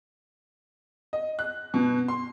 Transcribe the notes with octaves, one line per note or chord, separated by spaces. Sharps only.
D#5
F#6
B2
C6